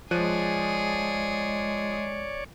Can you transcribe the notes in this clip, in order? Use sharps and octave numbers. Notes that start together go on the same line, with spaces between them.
F3 G#3 G#4 C#5 D5 F#6 D#7